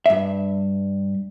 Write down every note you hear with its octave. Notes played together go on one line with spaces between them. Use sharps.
G2 E5